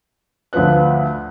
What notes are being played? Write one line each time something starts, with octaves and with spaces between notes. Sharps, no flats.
D2 F3 F4 B4 F#6